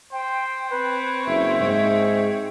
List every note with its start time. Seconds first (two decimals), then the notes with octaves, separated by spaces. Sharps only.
0.13 C5 G5
0.70 C4 B4 C#5
1.26 F#1 E5
1.59 G#2